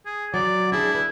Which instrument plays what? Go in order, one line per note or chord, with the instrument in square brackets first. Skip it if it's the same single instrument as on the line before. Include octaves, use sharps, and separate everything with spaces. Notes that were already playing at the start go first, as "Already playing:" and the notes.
[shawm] G#4
[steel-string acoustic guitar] F#3 [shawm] D5
[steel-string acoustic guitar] D4 G#4 [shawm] E4
[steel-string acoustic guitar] B4